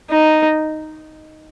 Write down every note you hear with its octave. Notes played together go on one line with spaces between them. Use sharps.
D#4